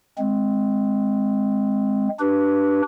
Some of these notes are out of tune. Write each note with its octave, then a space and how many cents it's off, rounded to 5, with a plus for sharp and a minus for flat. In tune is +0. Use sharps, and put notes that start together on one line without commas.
G#3 +0 C4 +0
D4 +0 G4 -30 B4 -10